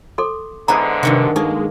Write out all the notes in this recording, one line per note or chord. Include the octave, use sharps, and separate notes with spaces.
A4 C6 D6
G#2 D3 B3 E4 G#4 A#5
G2 C3 D#3 F#4
G#3 A#3 D#4 A4 C#6